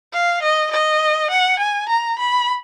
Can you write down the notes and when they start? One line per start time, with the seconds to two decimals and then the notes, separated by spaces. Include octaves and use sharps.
0.13 F5
0.42 D#5
0.71 D#5
1.30 F#5
1.59 G#5
1.89 A#5
2.18 B5